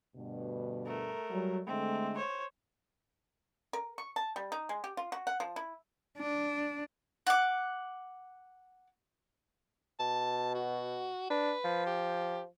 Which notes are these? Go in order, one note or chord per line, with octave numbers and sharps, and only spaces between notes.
D2 G2 B2
A3 A#4
F#3 G3
D3 G#3 A3 C4
C5 C#5
A#4
C#6
A5
G3
D#4
G#3
G4
F4
F#4
F#5
F3
E4
D4
F#5 D6
B2 A5
F#4
D4 B4
F3
G4